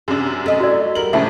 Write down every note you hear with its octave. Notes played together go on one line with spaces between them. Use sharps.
F#2 C3 D4 G#4
A3 D#5
F#4 D5
E2 G3 A#4 F#7
A2 C#3 F3 D4 E5 A5